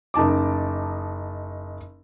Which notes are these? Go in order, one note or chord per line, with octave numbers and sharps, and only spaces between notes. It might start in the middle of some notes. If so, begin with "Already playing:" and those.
F#1 D#4 A5 D6